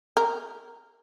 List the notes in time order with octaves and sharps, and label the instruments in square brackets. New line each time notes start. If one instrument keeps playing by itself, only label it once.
[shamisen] A#4